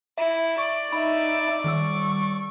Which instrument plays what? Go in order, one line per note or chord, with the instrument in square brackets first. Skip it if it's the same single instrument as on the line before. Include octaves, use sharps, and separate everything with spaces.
[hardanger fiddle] E4 [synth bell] E5
[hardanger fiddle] D5 [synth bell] C#6
[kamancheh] D#4 E5 [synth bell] B5
[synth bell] D#3 G3 E6 [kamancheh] C#6